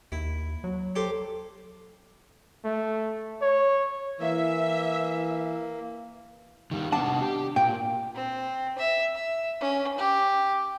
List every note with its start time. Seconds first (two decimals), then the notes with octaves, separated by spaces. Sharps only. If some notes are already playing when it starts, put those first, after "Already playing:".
0.12 D#2 E4
0.64 F#3
0.95 G4 A4 C5
2.64 A3
3.41 C#5
4.21 E3 A#3 E5
6.71 D#3 G3
6.92 C3 B3 D4 F#5 A5
7.21 G4
7.56 A#2 G5
8.15 C4
8.79 E5
9.15 E5
9.61 C#4
9.98 G4